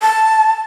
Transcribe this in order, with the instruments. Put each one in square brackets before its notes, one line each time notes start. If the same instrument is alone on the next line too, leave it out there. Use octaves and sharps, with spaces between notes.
[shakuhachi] A5